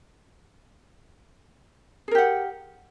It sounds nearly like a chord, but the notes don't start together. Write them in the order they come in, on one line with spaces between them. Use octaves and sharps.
G#4 A#4 G4 F#5